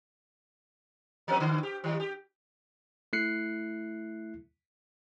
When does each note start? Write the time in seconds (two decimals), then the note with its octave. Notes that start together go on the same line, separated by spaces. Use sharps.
1.28 F3 C4 B4
1.40 D3
1.63 G4
1.84 D#3 G3
2.00 G4
3.13 A3 E4 F#6 C7 C#7